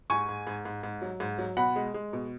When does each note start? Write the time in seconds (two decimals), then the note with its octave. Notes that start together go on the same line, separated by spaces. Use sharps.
0.10 G#2 G#5 C#6
0.29 G#2
0.47 G#2
0.65 G#2
0.83 G#2
1.02 F#3
1.20 G#2
1.38 F#3
1.57 B2 F#5 B5
1.76 G#3
1.94 G#3
2.13 B2